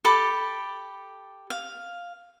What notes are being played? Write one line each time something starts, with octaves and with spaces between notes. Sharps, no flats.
G4 A4 B5 D6
F5